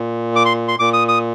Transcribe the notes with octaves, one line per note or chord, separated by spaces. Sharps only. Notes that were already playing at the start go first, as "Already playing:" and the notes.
Already playing: A#2
D6
C6
C6
A#2 D6
D#6
D#6